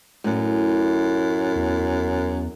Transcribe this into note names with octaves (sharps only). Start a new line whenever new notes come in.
F#2 A2
E2